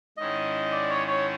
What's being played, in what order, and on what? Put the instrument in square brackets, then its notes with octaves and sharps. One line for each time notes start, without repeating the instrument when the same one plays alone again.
[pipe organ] G#2 D#3 G#3 C#4 E4 [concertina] D#5
[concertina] D5
C#5
C#5